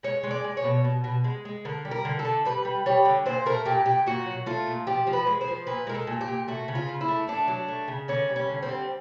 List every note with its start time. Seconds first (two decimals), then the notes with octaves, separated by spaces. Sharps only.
0.03 G#3 C#5
0.23 G#3
0.31 D5
0.44 G#3
0.57 C#5
0.64 B2
0.84 B2
1.04 B2
1.24 G#3
1.45 G#3
1.65 D3 A#4
1.85 G3
1.91 A#4
2.05 D3
2.19 A4
2.25 D3
2.45 G3 B4
2.65 G3
2.86 G3 C#5
3.05 D3
3.26 A#2 C5
3.46 A3 A#4
3.65 A#2 G4
3.86 A#2 G4
4.06 A#2 F#4
4.26 F#3
4.46 A3 F4
4.67 A#2
4.87 F3 G4
5.07 F3
5.13 B4
5.27 G#3
5.41 C5
5.48 F3
5.67 A#2 B4
5.87 G#3 A#4
5.94 A4
6.07 A#2
6.21 G4
6.28 A#2
6.48 A3 F#4
6.68 C#3
6.75 F4
6.89 C#3
7.01 E4
7.08 A3
7.28 A3 D4
7.48 F#3
7.68 A3
7.88 C#3
8.08 D3 C#4
8.29 G3
8.36 C#4
8.49 D3
8.63 C4
8.68 G3